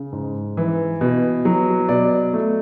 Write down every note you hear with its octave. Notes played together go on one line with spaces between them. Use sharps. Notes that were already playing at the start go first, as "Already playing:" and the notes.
Already playing: C#3
G#2
E3
B2
F#3
B2 D5
A3